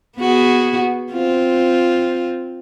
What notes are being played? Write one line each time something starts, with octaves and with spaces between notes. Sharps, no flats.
B3 F#4 G#4
C4 F4